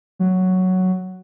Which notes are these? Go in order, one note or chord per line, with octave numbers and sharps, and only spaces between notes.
F#3